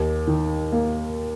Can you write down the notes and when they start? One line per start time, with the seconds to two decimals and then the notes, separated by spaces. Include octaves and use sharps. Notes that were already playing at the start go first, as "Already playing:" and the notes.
Already playing: D#2
0.27 D#3
0.72 A#3